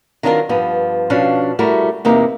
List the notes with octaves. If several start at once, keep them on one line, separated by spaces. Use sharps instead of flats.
D#3 F#3 D4 D#4 F4 A#4
G2 F3 B3
B2 F3 C#4 D4 F5
G3 A3 E4 F#4 A#4
E2 C3 A#3 D#4